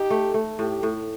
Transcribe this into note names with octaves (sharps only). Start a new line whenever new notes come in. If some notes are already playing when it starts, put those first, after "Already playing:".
Already playing: D#4 G4
A3
A3
A2 G4
A2